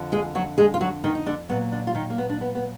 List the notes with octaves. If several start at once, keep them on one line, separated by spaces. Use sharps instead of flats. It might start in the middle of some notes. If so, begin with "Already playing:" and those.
Already playing: F2 D3 F3
G#3 G#4
F#3 F#4
G#3 G#4
F4
F#3 F#4
D#3 D#4
D#4
D3 D4
A#2 F#3 B3
D3 D4
F4
D#3 D#4
A#3
B3
D4
B3
B3